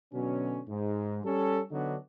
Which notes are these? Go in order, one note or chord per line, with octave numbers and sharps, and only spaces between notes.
B2 D3 F#3 C#4
G#2
G3 C#4 A4
D3 F#3 B3 D4 D#4 F#4